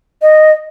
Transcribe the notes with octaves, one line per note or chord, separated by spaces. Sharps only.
D#5